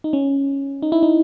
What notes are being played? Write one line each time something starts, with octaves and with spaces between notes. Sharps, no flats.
D#4
C#4
D#4
E4
D#4